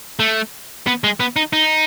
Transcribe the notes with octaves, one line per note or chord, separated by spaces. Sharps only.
A3
B3
G#3
B3
D#4
D#4